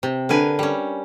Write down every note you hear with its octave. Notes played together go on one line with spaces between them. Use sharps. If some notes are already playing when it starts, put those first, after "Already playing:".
C3
D3 A#4 B4 G#5
G3 C#4